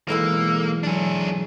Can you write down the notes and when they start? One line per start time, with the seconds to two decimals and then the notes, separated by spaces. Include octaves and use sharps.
0.08 B1 E3 G#3 A#3 A4
0.83 F#3 D4 G#4